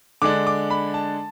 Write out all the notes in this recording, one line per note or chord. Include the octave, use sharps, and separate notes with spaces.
D3 G#3 D4 D6
D6
B5
A5